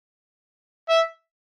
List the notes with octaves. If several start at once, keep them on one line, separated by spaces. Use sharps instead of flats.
E5